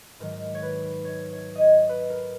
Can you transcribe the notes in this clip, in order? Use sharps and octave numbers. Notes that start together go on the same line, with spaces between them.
G#2 D#3 F#3 A#4
C#5
B4
C#5
C#5
D#5
C#5
B4
A#4